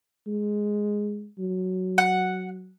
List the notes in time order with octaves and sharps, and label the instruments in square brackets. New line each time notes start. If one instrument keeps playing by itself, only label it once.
[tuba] G#3
F#3
[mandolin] F#5